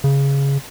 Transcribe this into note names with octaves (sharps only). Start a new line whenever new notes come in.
C#3